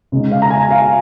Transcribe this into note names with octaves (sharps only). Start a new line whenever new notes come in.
C#3 G#3 D#4
F5
A#5
G#5
F5